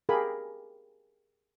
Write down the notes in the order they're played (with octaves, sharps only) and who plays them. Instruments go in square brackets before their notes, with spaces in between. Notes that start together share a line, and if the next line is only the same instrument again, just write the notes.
[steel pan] G4 G#4 A#4 F5 G#5 B5